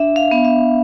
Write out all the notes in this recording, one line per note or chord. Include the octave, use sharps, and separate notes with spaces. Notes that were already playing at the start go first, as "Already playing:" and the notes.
Already playing: D4 E5
F5
B3
E5